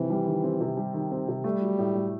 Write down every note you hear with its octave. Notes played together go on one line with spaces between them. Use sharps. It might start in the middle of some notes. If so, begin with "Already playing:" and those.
Already playing: C3 D#3 E3 G3 C4
G3
D#3
C4
C3
G3
D#3
C4
C3
G3 A3
F#3
A2
A2